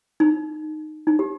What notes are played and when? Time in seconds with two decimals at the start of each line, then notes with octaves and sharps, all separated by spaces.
0.20 D#4
1.07 D#4
1.19 G4